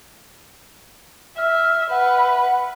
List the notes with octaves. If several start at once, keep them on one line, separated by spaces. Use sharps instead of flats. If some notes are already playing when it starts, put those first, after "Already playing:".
E5 F6
B4 F#5